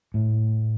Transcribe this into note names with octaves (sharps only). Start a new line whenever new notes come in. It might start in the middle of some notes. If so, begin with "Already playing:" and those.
A2